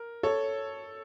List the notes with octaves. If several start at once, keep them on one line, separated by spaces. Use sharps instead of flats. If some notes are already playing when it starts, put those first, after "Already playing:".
Already playing: A#4
A4 C#5